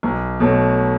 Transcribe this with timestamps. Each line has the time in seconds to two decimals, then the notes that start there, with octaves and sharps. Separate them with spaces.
0.03 B1
0.40 B2 F#3 A3